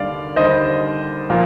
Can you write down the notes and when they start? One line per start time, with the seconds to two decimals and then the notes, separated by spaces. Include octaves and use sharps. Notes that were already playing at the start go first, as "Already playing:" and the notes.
Already playing: D#2 D3 G3 D5 F5
0.36 D#2 D3 G3 C5 D#5
1.30 A#2 F3 A#3 F4